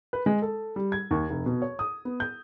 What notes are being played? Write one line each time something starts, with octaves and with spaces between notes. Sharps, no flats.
B4
G#3
A4
G3
G#6
D#2
F1
B2
C#5
D#6
B3
G6